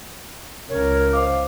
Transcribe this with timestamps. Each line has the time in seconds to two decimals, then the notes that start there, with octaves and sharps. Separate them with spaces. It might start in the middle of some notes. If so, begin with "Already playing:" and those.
0.70 C#2 C#3 A#4 C#5
1.13 C5 D#5 F5 D6